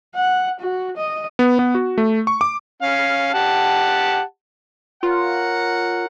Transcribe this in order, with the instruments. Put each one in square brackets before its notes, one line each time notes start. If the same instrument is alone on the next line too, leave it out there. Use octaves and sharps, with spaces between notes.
[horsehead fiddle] F#5
F#4
D#5
[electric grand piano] B3
B3
F#4
A3
C#6
D6
[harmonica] C#4 F5
G4 F#5 A5
[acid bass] F4 [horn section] A#4 C#5 F#5